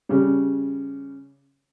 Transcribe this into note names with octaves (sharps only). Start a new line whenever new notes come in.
C#3 G3